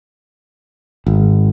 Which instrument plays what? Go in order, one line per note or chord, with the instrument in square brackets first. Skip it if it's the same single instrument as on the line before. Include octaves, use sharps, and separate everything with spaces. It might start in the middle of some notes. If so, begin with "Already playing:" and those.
[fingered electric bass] G#1